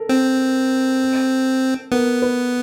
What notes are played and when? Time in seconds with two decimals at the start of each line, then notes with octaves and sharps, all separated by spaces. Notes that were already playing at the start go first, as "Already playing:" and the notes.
Already playing: A4 A#4
0.09 C4
1.92 B3 A#4
2.22 B4